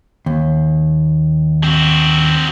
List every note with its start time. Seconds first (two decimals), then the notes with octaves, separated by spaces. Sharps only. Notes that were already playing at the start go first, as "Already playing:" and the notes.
0.26 D#2
1.64 C4 F#4